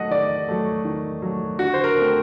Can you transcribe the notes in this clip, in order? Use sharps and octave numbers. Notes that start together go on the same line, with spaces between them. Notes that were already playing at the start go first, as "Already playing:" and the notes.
Already playing: D#3 F#3 A3 D#5 F#5
D#3 D5
F#3 A3
D#3
F#3 A3
D3 F#4
C5
A#4
A3 C4